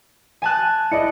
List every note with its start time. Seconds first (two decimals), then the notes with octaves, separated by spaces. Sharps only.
0.42 G#5 A5 F#6
0.92 E4 D5 D#5 C#7